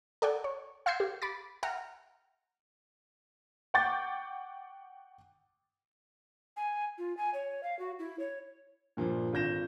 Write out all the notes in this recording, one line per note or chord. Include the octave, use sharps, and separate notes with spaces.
A4 D5 F#5 G5
C#5
F5 C6 E6 G6 G#6 C7
G4
B5 D6 A6
E5 F#5 G5 A#5 F6
F#5 G5 C#6 D6 G6 A6
G#5
F4
G#5
C#5
F5
F#4
E4
C#5
G2 A#2 F3
G#1 D3 F4 G6 A#6 E7